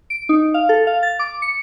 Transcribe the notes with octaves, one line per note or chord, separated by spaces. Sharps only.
D7
D#4
F5
A4
F5
A6
D6
C#7